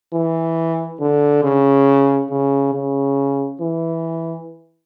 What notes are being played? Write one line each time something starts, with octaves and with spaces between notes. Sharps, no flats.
E3
D3
C#3
C#3
C#3
E3